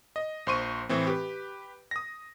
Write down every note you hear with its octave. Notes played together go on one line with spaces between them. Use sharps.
D#5
A#1 C5 C6 C#6 D#7
A2 E3 C4
G4 B4
D#6 A#6